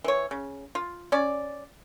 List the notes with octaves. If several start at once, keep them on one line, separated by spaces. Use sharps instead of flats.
E3 C#5
C#3
F4
C#4 D5